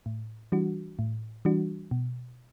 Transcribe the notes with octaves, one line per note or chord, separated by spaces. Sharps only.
A2
E3 G3 D4 F#4
A2
E3 G3 D4 F#4
B2